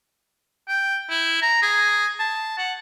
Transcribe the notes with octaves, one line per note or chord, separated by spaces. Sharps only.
G5
E4
A#5
G#4
A5
F#5